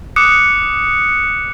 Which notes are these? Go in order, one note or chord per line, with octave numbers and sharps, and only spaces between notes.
D6 D#6 F#6 C#7